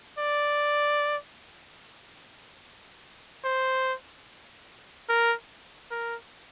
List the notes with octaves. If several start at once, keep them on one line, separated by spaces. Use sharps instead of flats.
D5
C5
A#4
A#4